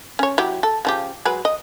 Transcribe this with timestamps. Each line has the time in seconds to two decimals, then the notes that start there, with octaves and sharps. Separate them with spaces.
0.19 C#4 C#5
0.38 F#3 E4 G4
0.63 A4
0.85 C#3 F3 G4
1.25 F#3 G#3 B4
1.45 D#5